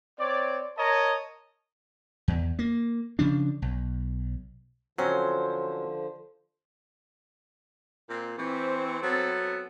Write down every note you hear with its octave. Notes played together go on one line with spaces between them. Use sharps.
C4 C#5 D5
A#4 C#5 D#5 A5 A#5
E2
A#3
C#3 F3 D4
B1
D3 F3 F#3 C4 C#4 C5
A#2 C4
E3 C4 G4 C#6
F#3 B3 A4